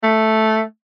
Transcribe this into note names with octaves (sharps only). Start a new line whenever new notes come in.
A3